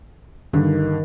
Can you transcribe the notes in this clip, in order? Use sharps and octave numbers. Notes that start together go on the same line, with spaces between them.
G2 D3 D#3